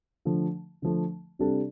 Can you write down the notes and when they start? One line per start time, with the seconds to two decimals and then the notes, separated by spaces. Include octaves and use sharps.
0.25 D3 F3 A3
0.82 D3 F3 A3
1.39 C3 G3 D4 A4